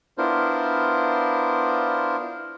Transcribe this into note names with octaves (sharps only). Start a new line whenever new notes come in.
B3 D4 E4 F4 A#4 C5